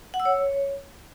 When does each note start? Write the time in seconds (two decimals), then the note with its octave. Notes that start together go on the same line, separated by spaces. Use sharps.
0.14 F#5
0.20 E6
0.25 C#5